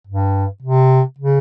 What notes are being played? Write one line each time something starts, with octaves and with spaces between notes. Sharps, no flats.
G2
C3
C#3